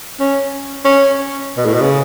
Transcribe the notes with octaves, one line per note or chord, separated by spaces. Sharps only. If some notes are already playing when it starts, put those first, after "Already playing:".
C#4
C#4
B2
A2
B2
C#3